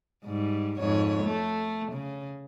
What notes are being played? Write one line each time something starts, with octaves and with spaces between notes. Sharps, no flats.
G#2 G3
F2 G#2 C#5
A3
C#3